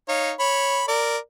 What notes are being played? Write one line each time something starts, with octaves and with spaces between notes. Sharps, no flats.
D#4 C#5 F5
C#5 B5
A#4 D5